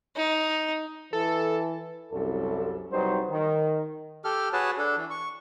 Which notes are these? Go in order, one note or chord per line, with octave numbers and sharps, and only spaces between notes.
D#4
E3 A4
C2 F#2 A4
C2 F#3 G3 D#4 B4 C5
D#3
G4 A4 F6
F#4 G#4 B4 C#5 A5
D4 A4
E3
C#6